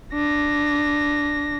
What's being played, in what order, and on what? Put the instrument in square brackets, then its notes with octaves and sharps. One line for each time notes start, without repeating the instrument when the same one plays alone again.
[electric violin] D4 A#6